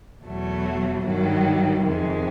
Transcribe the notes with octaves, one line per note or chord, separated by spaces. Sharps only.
E2 B2 F#3 A3
G2 D#3 F#3
F2 C3 D#3 G#3